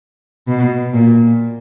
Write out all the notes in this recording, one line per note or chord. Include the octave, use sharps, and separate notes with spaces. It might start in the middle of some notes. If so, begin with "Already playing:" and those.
B2
A#2